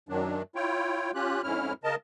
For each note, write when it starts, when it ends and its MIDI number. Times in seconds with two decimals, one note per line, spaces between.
0.09 0.42 42
0.09 0.42 51
0.09 0.42 54
0.09 0.42 62
0.55 1.11 64
0.55 1.11 65
0.55 1.11 73
0.55 1.11 79
1.15 1.42 61
1.15 1.42 65
1.15 1.42 67
1.15 1.42 90
1.43 1.73 41
1.43 1.73 44
1.43 1.73 61
1.43 1.73 64
1.43 1.73 89
1.84 1.95 49
1.84 1.95 70
1.84 1.95 75
1.84 1.95 81